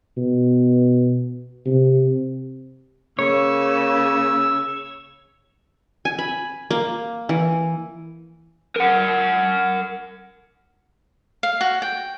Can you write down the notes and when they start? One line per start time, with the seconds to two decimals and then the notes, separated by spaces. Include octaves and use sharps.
0.17 B2
1.66 C3
3.19 C#3 A#3 C#5 E6
6.05 G#5
6.19 B5
6.71 A#3
7.29 E3
8.76 A#4 F#5
11.43 F5
11.61 F#4
11.82 G5